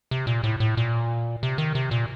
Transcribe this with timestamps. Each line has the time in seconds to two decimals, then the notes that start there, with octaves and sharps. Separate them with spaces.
0.11 C3
0.27 A#2
0.44 A2
0.60 A2
0.77 A#2
1.43 C3
1.58 D#3
1.75 C3
1.91 A#2